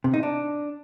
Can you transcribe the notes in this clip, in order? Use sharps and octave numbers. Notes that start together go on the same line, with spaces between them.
C3
D#4
D4